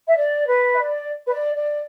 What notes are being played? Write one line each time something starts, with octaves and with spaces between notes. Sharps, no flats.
E5
D5
B4
E5
D5
B4
D5
D5